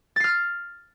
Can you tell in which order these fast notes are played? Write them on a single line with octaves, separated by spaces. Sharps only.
A6 C7 F6